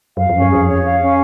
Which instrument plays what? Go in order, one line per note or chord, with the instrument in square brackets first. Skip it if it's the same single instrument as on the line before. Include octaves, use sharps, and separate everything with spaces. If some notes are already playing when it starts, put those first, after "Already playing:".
[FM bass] F#2 [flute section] F5
[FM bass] F2
[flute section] C#4
[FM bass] F#2
[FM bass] F2 [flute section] G#4
[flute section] C#5
F5
C#4